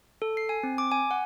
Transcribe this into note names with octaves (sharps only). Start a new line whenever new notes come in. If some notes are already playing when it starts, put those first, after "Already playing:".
A4
C7
G#5
C4
D6
G#5
F#5